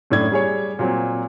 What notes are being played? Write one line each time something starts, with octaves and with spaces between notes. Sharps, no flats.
F#2 A2 D4 G#6
G3 G#4 C#5
A#2 F#3 C4